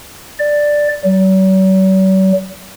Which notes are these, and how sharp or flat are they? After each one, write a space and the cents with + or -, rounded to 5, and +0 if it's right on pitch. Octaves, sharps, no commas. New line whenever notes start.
D5 +5
F#3 +45